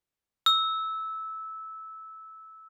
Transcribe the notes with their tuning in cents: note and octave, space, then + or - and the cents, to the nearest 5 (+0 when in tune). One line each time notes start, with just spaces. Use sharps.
E6 -15